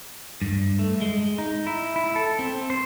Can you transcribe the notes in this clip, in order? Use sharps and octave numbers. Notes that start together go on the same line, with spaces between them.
G2
A3
G#3
D#4
E4
E4
A4
C4
C5